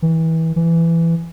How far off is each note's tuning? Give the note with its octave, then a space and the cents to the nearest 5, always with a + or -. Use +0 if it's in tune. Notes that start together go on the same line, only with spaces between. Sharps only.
E3 -25
E3 +15